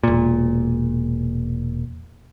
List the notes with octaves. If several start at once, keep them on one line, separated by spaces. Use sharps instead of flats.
E1 A#2